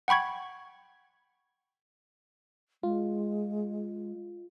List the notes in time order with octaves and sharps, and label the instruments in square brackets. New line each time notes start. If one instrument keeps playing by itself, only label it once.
[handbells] F#5 G5 B5 C#6 G#6
[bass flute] G#3 [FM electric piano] F4